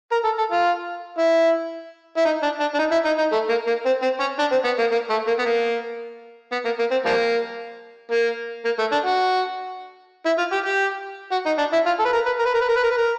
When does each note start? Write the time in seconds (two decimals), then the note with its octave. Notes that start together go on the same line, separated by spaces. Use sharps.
0.12 A#4
0.24 A4
0.38 A4
0.51 F4
1.18 E4
2.17 E4
2.25 D#4
2.43 D4
2.60 D4
2.74 D4
2.79 D#4
2.92 E4
3.05 D#4
3.18 D#4
3.32 A3
3.49 A#3
3.67 A#3
3.85 C4
4.02 C4
4.20 C#4
4.39 D4
4.51 C4
4.64 B3
4.79 A#3
4.91 A#3
5.10 A3
5.27 A#3
5.39 B3
5.45 A#3
6.52 B3
6.65 A#3
6.79 A#3
6.91 C4
7.05 F3 G3 A#3
8.11 A#3
8.65 A#3
8.78 A3
8.92 D4
9.05 F#4
10.25 E4
10.38 F4
10.52 G4
10.66 G4
11.31 F#4
11.46 D#4
11.58 D4
11.73 E4
11.86 F4
11.99 A4
12.05 B4
12.13 A#4
12.26 B4
12.39 A#4
12.45 B4
12.54 A#4
12.61 B4
12.68 A#4
12.76 B4
12.83 A#4
12.91 B4
12.97 A#4